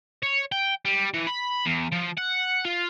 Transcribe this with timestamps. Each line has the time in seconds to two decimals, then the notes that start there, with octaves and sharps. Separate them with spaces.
0.23 C#5
0.52 G5
0.85 G3
1.14 E3
1.27 B5
1.66 E2
1.93 F3
2.18 F#5
2.65 F4